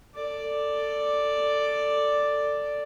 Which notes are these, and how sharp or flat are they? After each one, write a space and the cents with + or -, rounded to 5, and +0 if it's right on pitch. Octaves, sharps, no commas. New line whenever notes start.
A4 +20 D5 +0